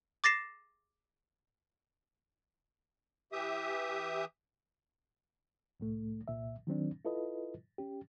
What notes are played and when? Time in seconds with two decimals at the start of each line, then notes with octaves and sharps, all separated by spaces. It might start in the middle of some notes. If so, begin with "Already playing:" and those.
0.24 D6 A6 A#6 C7 E7
3.32 E3 G4 E5 D#6
5.80 C2 A2 A3
6.28 C2 A#2 E5
6.67 D#3 F#3 C4 D4
7.05 E4 F4 A4 B4 D#5
7.78 C#4 G4